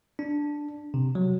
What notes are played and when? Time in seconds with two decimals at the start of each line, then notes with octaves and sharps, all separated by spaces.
0.19 D4
0.94 C3
1.15 F#3